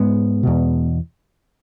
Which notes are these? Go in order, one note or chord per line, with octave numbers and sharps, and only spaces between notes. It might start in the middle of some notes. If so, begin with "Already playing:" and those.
Already playing: G#2 G#3 B3
E2 B2